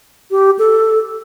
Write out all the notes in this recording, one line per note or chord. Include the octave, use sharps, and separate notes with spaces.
G4
A4